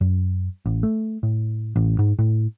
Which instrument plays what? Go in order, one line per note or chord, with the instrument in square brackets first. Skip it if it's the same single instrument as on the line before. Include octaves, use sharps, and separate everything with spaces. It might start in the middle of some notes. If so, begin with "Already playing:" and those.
[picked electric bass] F#2
A1
A3
A2
A1
G#2
A2